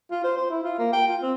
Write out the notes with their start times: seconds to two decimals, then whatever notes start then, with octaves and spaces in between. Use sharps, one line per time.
0.11 F4
0.24 C5
0.37 C5
0.50 E4
0.63 F4
0.79 A#3
0.93 G5
1.08 F4
1.22 C4